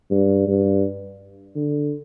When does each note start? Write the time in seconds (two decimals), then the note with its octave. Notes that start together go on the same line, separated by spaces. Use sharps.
0.11 G2
0.47 G2
1.56 D3